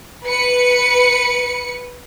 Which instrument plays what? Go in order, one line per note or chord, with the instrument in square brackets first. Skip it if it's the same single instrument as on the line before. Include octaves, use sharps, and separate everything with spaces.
[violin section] B4 C#7